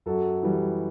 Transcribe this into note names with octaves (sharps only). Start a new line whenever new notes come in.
F#2 F#4 A4
E3 G3